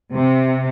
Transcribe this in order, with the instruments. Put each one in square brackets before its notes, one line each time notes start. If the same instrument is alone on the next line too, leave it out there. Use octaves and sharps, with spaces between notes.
[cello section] C3